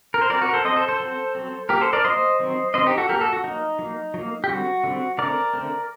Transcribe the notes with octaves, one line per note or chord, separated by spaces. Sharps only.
A#4
C5
F#3 C4 A#4 D5
F#4
A#4
A4 C5
F#3 C4 C5 D#5
A4 C5
A4 C5
F#3 C4
F#3 C4
F#3 A#3 G4 A#4
A4 C5
A#4 D5
F#3 A#3 C5 D#5
D#3 F#3 C4
D#3 F#3 C4 C5 D#5
D#4 G4
F#4 A4
F#3 A#3 G4 A#4
F#4 A4
F#4
F#3 A#3 D#4
F#3 A#3
F#3 A#3
G4
D3 G3 C4 F#4
D3 G3 C4
D3 A3 C4 A#4 D5
D3 A3 C4